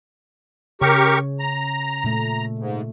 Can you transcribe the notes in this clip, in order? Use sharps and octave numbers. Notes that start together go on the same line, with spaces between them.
C#3 G4 A#4 C#5 C#6
A#5
A#2 A3
G#2